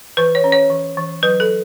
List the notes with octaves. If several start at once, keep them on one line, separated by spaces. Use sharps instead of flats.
E3 B4
C#5
C#4
C#5
E3
E3
F#3 B4
A4